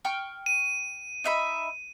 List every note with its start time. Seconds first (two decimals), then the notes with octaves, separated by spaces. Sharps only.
0.05 G5 C#6 F6
0.46 D#7
1.24 D#4 E5 B5